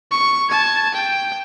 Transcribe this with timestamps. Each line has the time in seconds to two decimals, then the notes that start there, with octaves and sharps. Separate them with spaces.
0.11 C#6
0.49 A5 G#6
0.95 G5